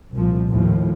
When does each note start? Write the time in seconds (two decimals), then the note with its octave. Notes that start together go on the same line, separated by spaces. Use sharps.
0.14 C2 A#2 F3
0.51 D#2 A2 F3